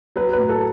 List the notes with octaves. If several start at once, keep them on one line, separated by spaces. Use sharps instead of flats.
F#3 B4
A2 B4
A4